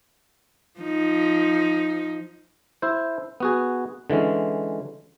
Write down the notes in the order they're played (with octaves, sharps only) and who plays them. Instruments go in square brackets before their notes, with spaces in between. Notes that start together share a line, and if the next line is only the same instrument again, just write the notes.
[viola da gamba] F3 D#4
[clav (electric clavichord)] E4 C5
B3 F#4 G#4
D3 E3 G#3 C#4